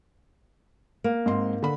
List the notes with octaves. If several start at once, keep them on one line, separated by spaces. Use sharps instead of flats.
A#3
G#2 C4 C6
D3 B5